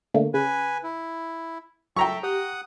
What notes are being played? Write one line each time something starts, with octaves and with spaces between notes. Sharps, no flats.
D3 A3 A#3
C#3 B4 G#5
E4
F#3 A4 E5 G5 A#5 C#6
G4 F#5 D#6